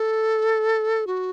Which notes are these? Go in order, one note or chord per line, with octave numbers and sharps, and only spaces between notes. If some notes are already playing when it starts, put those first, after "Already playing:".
Already playing: A4
F#4